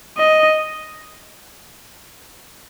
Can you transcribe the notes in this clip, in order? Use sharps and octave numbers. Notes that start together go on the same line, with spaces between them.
D#5